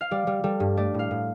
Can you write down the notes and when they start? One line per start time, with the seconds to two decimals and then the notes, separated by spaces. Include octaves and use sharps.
0.01 F5
0.11 G3 D5
0.27 G3
0.44 G3 A4
0.60 G2
0.77 A3 D5
0.94 A2 F5
1.11 A2